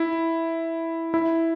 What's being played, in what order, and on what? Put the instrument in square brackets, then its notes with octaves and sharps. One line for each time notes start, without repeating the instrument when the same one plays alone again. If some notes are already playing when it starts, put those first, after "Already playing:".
Already playing: [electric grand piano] E4
E4